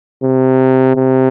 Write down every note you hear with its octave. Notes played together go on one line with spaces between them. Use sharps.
C3
C3